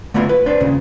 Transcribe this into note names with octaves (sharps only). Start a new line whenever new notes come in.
D3 A3 B3 E4 F4
B4
D4 B4 C5
D#2 A#2 C#3